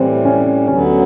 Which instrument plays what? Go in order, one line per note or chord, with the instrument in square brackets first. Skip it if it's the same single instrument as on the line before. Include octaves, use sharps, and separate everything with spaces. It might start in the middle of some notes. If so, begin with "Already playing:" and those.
Already playing: [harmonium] A2 E3 G3 [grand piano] C4
[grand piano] C#4
[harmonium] D2 D3 F#3 B3 [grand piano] C#4